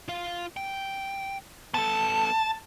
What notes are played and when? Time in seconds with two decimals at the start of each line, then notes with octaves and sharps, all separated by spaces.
0.08 F4 F5
0.57 G5
1.74 B3 A4 A5